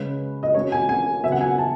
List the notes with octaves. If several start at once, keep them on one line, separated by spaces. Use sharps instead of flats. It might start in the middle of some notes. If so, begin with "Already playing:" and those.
Already playing: C#3 G#3 C#4 B4
D#5
B2 G#3 C#4 C#5
G#5
G#5
C#3 F#3 B3 E5
F#5
G#5
A5